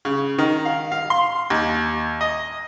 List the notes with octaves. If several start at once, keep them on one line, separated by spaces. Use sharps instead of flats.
C#3
D#3
F5
F5
C6
D#2
D#5